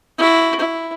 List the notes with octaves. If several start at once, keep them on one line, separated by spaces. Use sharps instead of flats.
E4 F#4
E4